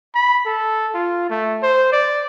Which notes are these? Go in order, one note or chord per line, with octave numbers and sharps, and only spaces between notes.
B5
A4
F4
A3
C5
D5